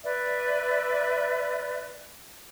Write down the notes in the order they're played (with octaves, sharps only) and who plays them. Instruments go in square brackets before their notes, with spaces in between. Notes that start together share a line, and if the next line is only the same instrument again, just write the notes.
[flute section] B4 D5 E5